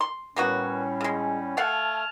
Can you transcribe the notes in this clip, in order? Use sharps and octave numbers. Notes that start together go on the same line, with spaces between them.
C6
A2 G3 A#3 B3 C#4 F#4
C#3 G#3
A3 F5 F#5 G#5 A5 F6